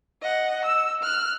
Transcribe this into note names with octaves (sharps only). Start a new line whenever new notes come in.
D#5 F#5
E6
F6 F#6